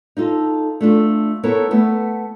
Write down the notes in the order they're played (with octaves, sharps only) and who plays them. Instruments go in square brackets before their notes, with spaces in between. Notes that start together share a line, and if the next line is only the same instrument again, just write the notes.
[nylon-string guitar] D#4 F4 A4
A3 D4 F4
B3 E4 A4 A#4 C#5
A3 B3